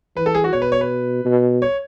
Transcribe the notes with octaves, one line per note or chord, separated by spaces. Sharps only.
E3 B4
A4
G#4
F#4
B2 C#5
B4
C#5
B4
B2
C#5